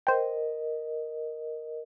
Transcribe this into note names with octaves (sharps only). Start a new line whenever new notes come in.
A#4 C5 D#5 G5